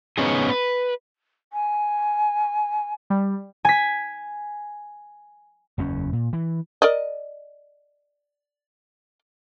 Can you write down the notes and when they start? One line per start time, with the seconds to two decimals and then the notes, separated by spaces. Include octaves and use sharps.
0.18 B3 C#4 D#4 G#4
0.49 B4
1.53 G#5
3.10 G3
3.65 G#5 B6
5.78 F#1 E2 C#4
6.13 A#2
6.33 E3
6.82 A#4 D5 D#5